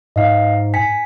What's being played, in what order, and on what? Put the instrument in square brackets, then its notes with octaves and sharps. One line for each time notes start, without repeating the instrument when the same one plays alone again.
[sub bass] G#2 [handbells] D#5 F5
[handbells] G#5 B6 C#7